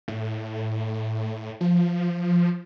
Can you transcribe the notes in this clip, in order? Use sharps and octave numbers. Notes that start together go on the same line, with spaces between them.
A2
F3